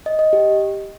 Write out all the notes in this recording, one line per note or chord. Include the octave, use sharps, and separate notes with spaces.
D#5
D#5
G4